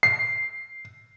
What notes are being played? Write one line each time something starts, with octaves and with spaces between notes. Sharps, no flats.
C7